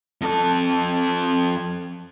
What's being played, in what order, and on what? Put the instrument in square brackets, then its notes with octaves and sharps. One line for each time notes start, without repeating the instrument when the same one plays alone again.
[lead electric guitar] F2 A4